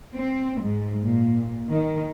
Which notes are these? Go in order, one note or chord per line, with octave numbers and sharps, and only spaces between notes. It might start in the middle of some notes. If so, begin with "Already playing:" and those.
C4
G#2
A#2
D#3